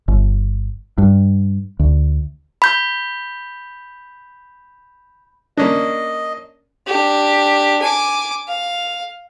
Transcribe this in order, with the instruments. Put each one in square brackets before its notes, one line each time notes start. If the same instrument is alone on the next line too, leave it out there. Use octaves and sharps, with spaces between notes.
[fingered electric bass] G1
G2
D2
[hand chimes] B5 G6
[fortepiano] A#3 C#4 D4 [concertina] D#5
[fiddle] D4 G4
G#5 D6
F5